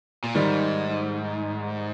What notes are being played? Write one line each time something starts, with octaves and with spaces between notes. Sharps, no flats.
A#2
G#2 D#3 G3